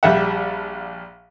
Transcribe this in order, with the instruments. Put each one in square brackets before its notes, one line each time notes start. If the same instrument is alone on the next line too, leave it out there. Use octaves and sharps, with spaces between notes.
[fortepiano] A#1 G3 E5 F#5